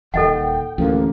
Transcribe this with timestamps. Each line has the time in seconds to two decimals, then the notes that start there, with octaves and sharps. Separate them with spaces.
0.14 D#1 D#2 D#3 A4 D#5 F#5 G5
0.78 A1 D2 F3 A#3